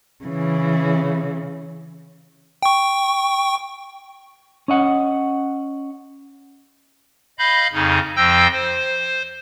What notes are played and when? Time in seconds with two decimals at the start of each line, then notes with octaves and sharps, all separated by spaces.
0.25 C#3 E3
2.63 G5 C#6
4.68 C#4 D#5 F#5
7.39 D#5 F5 B5 G6
7.73 F2 C#3 D#4
8.16 F2 F3 G5 E6 G6 A#6
8.52 C5